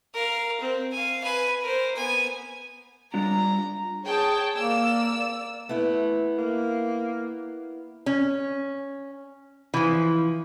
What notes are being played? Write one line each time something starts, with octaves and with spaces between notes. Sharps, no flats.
A#4 F5
C4
F5 G#5
B4 G#5
A#4 C5
B3 G#5
G3 D4 F4 A#5
G#4 C#5 G5 A5
A#3 D5 E6
A3 B3 E4
A#3
C#4
E3 F3